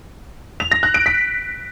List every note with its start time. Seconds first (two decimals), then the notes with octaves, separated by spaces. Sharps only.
0.60 F7
0.72 A#6
0.83 F#6
0.94 D7
1.06 B6